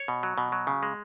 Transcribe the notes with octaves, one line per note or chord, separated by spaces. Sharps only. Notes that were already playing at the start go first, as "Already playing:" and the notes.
Already playing: C#5
B2
F#3
B2
F#3
C#3
G#3